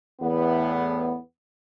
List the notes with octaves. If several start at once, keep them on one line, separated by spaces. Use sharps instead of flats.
E2 A2 B3